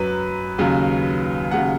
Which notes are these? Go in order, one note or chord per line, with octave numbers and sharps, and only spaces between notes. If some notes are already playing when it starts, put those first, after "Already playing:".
Already playing: F#2 F#3 B4
D#2 C#3 F#3
D#2 C#3 F#3 F#5